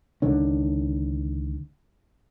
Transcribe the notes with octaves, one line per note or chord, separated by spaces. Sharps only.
C#2 D3 D#3 C#4